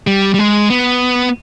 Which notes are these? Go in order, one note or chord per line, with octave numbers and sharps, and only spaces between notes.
G3
G3
G#3
B3